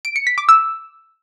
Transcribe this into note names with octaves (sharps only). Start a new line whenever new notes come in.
D7
C#7
B6
D6
E6